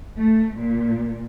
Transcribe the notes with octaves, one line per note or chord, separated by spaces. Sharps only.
A3
A#2